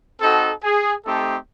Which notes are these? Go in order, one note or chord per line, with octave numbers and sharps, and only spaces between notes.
C4 D#4 F#4 A4
G#4
A3 C4 D#4 G4 A4